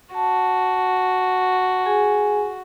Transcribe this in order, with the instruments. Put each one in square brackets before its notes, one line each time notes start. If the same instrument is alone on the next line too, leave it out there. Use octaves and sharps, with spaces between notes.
[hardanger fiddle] F#4 [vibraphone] A5
[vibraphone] G#4 G#5